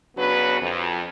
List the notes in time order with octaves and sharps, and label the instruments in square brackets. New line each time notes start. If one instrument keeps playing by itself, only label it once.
[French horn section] C#3 F#3 B3 D4 F#4 B4
F2